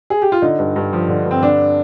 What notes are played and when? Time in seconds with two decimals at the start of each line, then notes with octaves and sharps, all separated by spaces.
0.10 G#4
0.22 G4
0.32 F4
0.42 D3 D#4
0.59 G2
0.76 G2
0.93 F3
1.09 D3
1.25 G2
1.31 C4
1.42 D3 D4